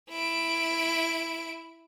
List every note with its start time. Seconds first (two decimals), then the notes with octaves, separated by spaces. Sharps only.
0.10 E4 D7